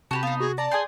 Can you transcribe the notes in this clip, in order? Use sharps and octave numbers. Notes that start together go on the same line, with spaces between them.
C3 F#4 G4 B4 A5
B3 D#4 F5
F#4 G#4
D5 A5 A#5
G#4 G#5 C6 G6 G#6